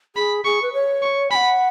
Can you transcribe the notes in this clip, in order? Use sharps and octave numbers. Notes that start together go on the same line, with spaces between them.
G#4 B5
G#4 C#6
B4
C#5
C#6
G#5 B5
F#5